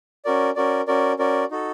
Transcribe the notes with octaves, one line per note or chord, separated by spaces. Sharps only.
C#4 F#4 A#4 D5
C#4 F#4 A#4 D5
C#4 F#4 A#4 D5
C#4 F#4 A#4 D5
D#4 F#4 A4